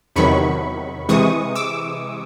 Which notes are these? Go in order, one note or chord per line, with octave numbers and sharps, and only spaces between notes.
E2 C3 D#3 F#3 B5 C#6
C3 E3 G#3 C#6 D#6
D6 E6